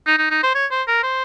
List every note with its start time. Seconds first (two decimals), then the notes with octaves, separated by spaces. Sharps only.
0.07 D#4
0.18 D#4
0.31 D#4
0.43 C5
0.55 C#5
0.71 C5
0.88 A#4
1.03 C5